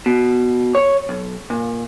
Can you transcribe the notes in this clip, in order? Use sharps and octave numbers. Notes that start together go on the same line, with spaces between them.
B2
C#5
B1
A#2